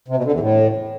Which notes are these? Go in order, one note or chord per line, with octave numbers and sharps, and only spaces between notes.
C3
B2
D3
E2
A2